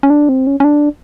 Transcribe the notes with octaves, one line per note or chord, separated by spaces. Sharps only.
C#4
D4
C4
C#4
C#4
D4